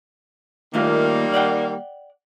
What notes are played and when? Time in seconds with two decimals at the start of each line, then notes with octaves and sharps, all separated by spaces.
0.74 D#2 D#3 G3 A3 A#3 F4
1.34 D5 F#5 G5